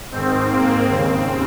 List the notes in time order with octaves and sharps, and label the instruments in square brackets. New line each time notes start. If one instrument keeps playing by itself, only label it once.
[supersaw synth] G#2 D#3 C4
A#3
D#2 C#3 C4